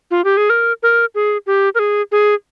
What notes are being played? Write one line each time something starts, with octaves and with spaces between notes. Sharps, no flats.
F4
G4
G#4
A#4
A#4
G#4
G4
A#4
G#4
G#4